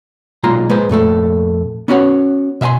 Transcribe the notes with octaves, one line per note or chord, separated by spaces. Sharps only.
B1 A#2 G#3 F4 A#5 C6
G#3 B4 C5
F2 A#2 A3 A4
B3 C#4 E4 F#4 C#5 F#5
B2 E5 F5 G#5 C6